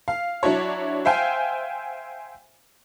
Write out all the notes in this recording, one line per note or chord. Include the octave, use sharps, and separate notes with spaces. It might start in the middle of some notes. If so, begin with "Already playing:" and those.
F5
F#3 D4 E4 F#4 C#5
C5 E5 F5 G5 G#5